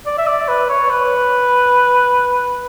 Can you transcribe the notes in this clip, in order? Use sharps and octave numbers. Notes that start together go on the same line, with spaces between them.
D5
E5
D5
B4
C#5
B4